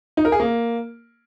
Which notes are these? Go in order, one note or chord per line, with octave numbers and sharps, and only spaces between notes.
D#4
A#4
G#4
A#3